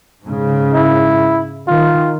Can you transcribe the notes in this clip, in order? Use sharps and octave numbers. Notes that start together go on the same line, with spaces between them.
G#2 C#3
E4
D#3 F4